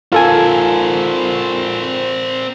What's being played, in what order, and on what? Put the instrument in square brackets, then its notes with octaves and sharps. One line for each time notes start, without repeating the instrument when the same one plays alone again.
[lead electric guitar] C4 A#4 [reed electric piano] F4 A4 G#5